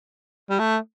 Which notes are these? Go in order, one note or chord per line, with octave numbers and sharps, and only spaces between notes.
G3
A3